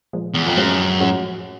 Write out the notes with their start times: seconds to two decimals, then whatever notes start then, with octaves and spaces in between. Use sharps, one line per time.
0.13 A#2 F3 G#3
0.34 E2
0.46 F2
0.56 F#2 A2 F3 G#3 C#4 F#4
1.00 A2 F3 G#3 C#4 F#4